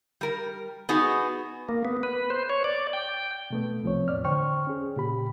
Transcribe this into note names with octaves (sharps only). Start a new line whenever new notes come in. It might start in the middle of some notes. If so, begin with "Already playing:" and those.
G3 A#4
B3 D#4 F#4 G#4
A#3
B3
B4
C5
C#5
D5
G5
B2 A3 B3
C2 F3 C4 C#5
E2 A2 D5 F6
D3 C5 G5 C#6 F6
C#4 G#4
A#2 C#3 G4 B5